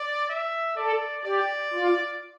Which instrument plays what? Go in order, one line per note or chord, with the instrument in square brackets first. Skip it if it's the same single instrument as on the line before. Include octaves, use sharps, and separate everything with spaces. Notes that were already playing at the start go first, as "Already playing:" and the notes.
Already playing: [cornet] D5
E5
[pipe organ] A4 [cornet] D5
[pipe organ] G4 [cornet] D5
[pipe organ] F4